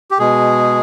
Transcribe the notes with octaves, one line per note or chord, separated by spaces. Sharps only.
G4
B2 G#3 G#4